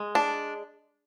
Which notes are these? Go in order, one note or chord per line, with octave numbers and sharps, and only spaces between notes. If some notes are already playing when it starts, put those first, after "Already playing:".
Already playing: G#3
D4